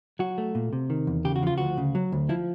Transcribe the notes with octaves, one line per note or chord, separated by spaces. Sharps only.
F#3 F#4
A3
A#2
C3
D#3
E2
C#3 G4
F#4
F3 F4
D2 F#4
C#3
F#3
D2
F3 E4